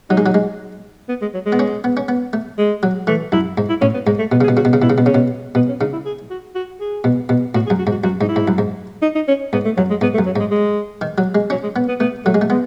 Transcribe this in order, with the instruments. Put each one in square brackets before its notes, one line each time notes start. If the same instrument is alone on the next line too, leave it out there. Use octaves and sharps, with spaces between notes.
[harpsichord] F#3 [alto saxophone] D#4
[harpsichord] G#3
F#3
G#3
[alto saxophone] B3
G#3
F#3
G#3
[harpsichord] B3
C#4
B3
C#4
B3
A3
[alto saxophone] G#3
[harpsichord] F#3
[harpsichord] E3 [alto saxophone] A3
[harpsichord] F#2 [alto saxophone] E4
[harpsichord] G#2
[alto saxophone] E4
[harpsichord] A2 [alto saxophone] C#4
[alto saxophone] B3
[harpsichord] G#2 [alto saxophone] G#3
[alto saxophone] A3
[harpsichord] B2 [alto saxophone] B3
[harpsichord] C#3 [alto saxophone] G#4
[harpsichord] B2
[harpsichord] C#3 [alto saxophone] F#4
[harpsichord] B2
C#3
[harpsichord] B2 [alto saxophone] E4
[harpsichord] C#3
B2
[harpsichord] C#3 [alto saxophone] C#4
[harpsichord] B2
[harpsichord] B2 [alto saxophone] B3
[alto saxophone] C#4
[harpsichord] C#3 [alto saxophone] D#4
[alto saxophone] E4
G#4
F#4
F#4
G#4
[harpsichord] B2
B2
[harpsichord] A2 [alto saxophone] F#4
[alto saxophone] G#4
[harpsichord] F#2
[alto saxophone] F#4
[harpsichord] G#2
[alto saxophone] F#4
[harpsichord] F#2 [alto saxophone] F#4
[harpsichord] G#2 [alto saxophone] D#4
[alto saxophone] E4
[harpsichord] G#2
F#2
G#2
[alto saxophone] D#4
D#4
C#4
[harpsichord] G#2 [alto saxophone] B3
[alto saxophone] A3
[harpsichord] F#2 [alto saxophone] F#3
[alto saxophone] G#3
[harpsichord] G#2 [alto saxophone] B3
[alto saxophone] A3
[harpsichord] F#2
[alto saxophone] F#3
[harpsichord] G#2 [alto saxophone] G#3
[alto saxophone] G#3
[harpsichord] D#3
F#3
G#3
[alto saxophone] F#3 [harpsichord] C#4
[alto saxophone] G#3
[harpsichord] B3
[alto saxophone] B3
[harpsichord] A3 [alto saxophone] B3
[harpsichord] F#3 [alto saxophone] A3
[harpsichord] G#3
A3
[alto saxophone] G#3 [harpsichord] B3